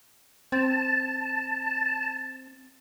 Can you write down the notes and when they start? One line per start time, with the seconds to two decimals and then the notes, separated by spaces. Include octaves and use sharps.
0.52 C4 A5